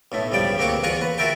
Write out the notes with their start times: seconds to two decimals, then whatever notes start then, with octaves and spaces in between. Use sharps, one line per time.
0.12 B1 A2 A3
0.32 C#2 G2 F3 G3 D5 G5
0.58 D2 A#3 C4 F#4 C#5 D6
0.83 E2 F4 F#5 G#5 A#5 C#6
1.01 B4
1.18 F4 F#4 A#4 E5 G5 A5